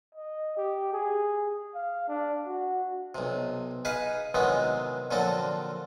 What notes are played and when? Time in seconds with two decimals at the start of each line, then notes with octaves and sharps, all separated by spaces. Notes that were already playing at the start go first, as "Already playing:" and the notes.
0.15 D#5
0.57 G4
0.93 G#4
1.75 F5
2.08 D4
2.46 F#4
3.15 B1 C3
3.85 D#4 G#4 B4 F5
4.35 C3 D#3 E3 F#3 G#3 B3
5.11 A#2 D3 F3 F#3 C4 A4